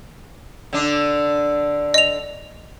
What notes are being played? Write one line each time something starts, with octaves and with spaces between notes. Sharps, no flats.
D3 D4
D#5 F7